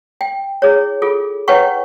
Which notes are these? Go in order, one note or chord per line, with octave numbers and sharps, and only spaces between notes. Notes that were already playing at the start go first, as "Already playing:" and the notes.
G5
E4 G#4 C#5
F4 G#4 A4
E4 B4 C#5 F#5 G5 C#6